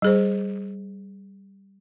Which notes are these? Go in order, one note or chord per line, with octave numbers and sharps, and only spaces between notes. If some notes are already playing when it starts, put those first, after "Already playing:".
G3 G#4 C5